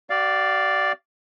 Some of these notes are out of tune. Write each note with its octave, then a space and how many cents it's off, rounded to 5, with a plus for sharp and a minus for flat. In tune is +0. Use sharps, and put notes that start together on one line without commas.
F#4 +40 D5 +0 F5 +0